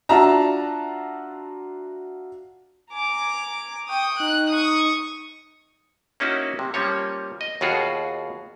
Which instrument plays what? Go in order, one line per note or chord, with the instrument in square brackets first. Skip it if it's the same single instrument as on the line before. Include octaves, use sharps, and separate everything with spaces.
[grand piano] D4 F4 F#4 E5 A5 A#5
[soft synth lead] G#5 [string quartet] A#5 D6
[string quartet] G5 D#6 [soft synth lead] C#6
[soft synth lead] D#4 [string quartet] F#6
[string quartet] C#6 D#6
[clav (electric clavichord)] A#3 C#4 D#4 E4 F#4
C3
F3 G3 A#3 C#4 C#5
D#5
D#2 B2 F4 F#4 G#4